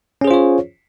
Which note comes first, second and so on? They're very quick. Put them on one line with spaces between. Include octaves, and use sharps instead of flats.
C#4 G#4 C5 F4 C#5